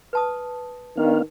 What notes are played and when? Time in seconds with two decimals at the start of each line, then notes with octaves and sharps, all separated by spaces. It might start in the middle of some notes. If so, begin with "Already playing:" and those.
0.13 B4 A5 D#6
0.97 D#3 B3 D4 F5